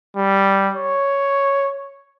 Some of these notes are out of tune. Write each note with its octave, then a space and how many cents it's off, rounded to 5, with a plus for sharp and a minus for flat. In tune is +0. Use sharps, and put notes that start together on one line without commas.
G3 -5
C#5 +0